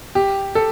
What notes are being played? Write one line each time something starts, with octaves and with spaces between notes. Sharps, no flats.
G4
A4